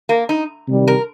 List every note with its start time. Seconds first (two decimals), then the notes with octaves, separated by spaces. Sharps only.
0.09 A#3
0.29 D#4
0.68 C3 D#3 G3
0.87 A#4